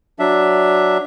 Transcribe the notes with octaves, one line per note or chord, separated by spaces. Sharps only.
F#3 D4 E5